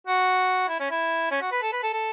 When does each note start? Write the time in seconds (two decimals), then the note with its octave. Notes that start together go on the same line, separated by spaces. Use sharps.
0.07 F#4
0.69 E4
0.80 C#4
0.90 E4
1.31 C#4
1.41 F#4
1.52 B4
1.62 A4
1.72 B4
1.83 A4
1.93 A4